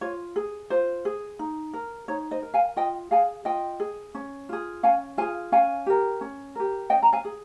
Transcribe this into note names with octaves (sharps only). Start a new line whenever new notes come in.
F4 C#5
G#4
F4 C5
G#4
D#4
A#4
D#4 C#5
C5 D#5
A#4
F5 G#5
F4 D#5 G5
G#4 F5 G#5
F4 D#5 G5
G#4
C#4
F4 G#4
C#4 F5 G#5
F4 G#4 F5 G#5
C#4 F5 G#5
G4 A#4
C#4
G4 A#4
C#4 D#5 G5
A#5
F5 G#5
G#4